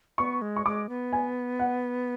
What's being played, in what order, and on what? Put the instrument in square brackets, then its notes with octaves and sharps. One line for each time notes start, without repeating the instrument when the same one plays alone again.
[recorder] B3 [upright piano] C#6
[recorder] G#3
[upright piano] C#6
[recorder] G#3 [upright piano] D6
[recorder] B3
[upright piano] G#5
F#5